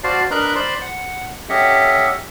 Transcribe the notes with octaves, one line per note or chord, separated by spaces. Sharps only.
F#4 C5 D5 F5 A5
D4 A#4 B4 D#5 A#5 B5
C5 D5 B5 C6
F#5
C#4 G4 A4 D#5 E5 F#5